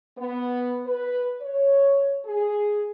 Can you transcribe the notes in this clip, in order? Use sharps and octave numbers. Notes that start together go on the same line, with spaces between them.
B3
B4
C#5
G#4